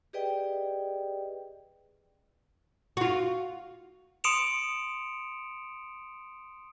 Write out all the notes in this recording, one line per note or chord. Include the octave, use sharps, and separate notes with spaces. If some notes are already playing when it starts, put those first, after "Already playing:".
G4 G#4 B4 D5 D#5 G5
F4 F#4
C6 D#6 C#7 D7 E7 F7